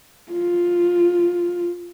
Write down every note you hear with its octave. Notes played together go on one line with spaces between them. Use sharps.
F4